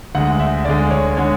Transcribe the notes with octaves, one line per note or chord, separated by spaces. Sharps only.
D2 D3 G#3 F#5
E5
D2 D3 G#3 D5
C#5
D3 G#3 C#5